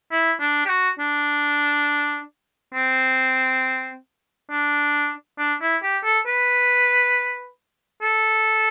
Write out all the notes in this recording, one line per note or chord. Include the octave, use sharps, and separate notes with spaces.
E4
D4
G4
F#4
D4
C4
D4
D4
E4
G4
A4
B4
A4